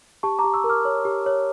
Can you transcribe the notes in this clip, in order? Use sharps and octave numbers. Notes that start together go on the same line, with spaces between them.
G4 A5 C#6
A#5 D6
G4
C#6 E6
A#4
D6 F6
C#5
G4
C#5